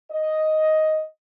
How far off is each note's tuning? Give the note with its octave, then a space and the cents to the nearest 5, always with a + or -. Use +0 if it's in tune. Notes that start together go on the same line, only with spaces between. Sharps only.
D#5 +5